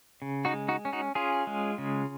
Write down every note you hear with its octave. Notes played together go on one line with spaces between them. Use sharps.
C#3
D#4 F#4
G#3
D#4 F#4
C#4
D#4 F#4
C#4 F4 G#4
G#3
C#3